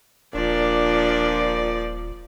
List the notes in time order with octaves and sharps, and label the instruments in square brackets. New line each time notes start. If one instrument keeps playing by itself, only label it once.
[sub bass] D#1 [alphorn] A#2 [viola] F3 D5 [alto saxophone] D4